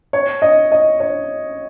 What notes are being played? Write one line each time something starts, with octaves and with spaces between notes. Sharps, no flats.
C#5
D#5
D#5
C#5